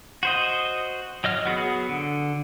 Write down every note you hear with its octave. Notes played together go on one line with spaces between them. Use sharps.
F#4 C5 D#5
F#3 D#5 F6
F#3 B3 F#4 G#4
D3